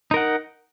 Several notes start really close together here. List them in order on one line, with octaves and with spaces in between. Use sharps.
D#4 A#4 F#5